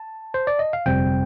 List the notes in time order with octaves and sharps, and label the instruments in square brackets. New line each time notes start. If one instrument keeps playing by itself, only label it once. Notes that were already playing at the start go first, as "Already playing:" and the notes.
Already playing: [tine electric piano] A5
C5
D5
D#5
F5
G1 F2 C3 G3 C4 G5